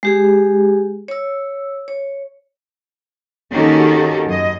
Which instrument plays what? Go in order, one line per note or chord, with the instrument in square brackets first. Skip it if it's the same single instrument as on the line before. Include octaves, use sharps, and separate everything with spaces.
[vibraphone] G#3 G4 G#4
C#5 E6
C#5
[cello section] D#3 A#3 C#4 F#4 G4 A4
F#2 D#5